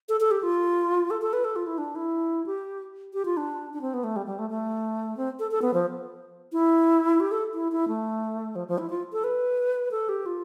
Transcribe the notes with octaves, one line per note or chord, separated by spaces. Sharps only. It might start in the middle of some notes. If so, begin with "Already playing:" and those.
A4
A4
G4
F4
A4
A4
B4
A4
F4
E4
D4
E4
G4
G4
F4
D4
D4
C4
B3
A3
G3
G3
A3
A3
C4
A4
A4
B3
F3
E4
G4
A4
E4
E4
A3
F3
F3
E4
F4
A4
B4
A4
G4
F4